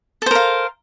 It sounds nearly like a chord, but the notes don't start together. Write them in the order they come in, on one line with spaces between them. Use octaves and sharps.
A4 C5 A#4 F5